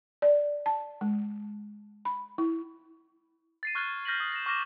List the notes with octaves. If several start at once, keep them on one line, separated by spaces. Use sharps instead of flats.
D5
A5
G#3
B5
E4
A6 C7 D#7
C#6 F6 F#6 G#6 A6 G7
F6 G6 A#6 B6 D#7 F#7
D#6
A#6 E7
C#6 D6 F6 A#6 E7 G7